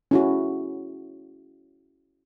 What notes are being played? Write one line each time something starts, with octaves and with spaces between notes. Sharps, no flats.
C#4 E4 F#4